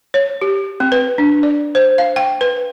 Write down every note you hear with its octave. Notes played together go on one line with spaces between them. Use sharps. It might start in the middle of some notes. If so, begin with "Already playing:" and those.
C#5
G4
C4
B4
D4
D5
C5
F5
G5
B4